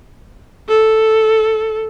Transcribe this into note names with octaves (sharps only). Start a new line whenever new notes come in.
A4